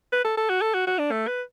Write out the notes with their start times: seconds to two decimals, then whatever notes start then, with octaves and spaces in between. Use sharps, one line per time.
0.12 B4
0.25 A4
0.37 A4
0.49 F#4
0.61 A4
0.74 F#4
0.87 F#4
0.99 D4
1.11 A3
1.27 B4